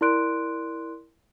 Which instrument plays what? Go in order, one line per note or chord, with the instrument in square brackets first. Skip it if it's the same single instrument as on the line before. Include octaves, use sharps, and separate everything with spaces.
[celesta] E4 A#4 D5 C6 F#6 D7